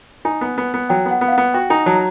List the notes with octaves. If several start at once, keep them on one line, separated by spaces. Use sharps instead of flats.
D#4 G#5
B3
B3
B3
F#3 G5
B3
F#5
B3
F5
F#5
B3
F#4 G5
D#4 G#5
F#3 A5
A#5